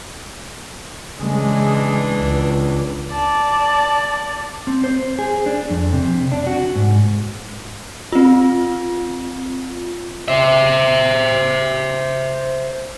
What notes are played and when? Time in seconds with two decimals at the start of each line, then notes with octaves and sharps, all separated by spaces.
1.20 C#3 E3 G#3 D4
2.18 C#2
3.10 D5 A5
4.67 C4
4.84 C5
5.19 G#4
5.46 D4
5.70 F2
5.93 C3
6.32 D4
6.47 F#4
6.75 G#2
8.12 C4 F4
10.28 C5 E5